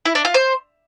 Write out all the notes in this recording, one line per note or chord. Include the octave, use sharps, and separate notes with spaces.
E4
D4
F4
C5